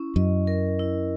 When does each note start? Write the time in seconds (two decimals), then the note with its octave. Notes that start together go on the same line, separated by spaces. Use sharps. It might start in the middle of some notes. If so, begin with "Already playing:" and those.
Already playing: C#4 E4
0.16 F#2 D#5
0.47 A#4
0.79 E4